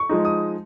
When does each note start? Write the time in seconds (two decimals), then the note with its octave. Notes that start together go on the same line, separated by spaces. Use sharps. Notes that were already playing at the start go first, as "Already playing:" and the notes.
Already playing: C#6
0.09 F3 G#3 D#4
0.25 D#6